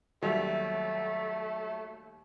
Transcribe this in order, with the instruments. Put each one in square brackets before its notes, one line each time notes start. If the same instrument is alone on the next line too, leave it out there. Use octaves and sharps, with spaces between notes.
[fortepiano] D#2 G3 [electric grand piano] F#3 E5 [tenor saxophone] A3